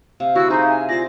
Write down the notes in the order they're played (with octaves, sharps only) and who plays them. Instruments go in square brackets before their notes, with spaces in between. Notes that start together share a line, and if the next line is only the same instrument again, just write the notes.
[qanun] C3 [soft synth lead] F5
[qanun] E4 A4 C5 [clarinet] F#4 [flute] E6
[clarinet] D#4 [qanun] G#4 E5 [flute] C5
[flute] G#5
[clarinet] F4 [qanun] C5 D5 [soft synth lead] G#5 [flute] A#6